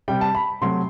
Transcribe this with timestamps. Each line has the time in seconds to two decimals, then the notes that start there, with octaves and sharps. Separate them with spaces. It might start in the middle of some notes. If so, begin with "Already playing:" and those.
0.08 C3 G3 G5
0.21 A5
0.35 B5
0.61 C3 F#3 A3 C6